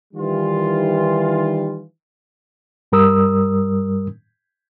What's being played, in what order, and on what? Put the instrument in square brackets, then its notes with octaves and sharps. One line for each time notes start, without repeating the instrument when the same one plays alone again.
[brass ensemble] D#3 E3 G3 F4
[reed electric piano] G2 G3 A#4 D#6 E6